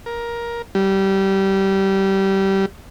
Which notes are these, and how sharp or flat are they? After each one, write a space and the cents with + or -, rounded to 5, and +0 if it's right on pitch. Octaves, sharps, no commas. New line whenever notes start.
A#4 +15
G3 -20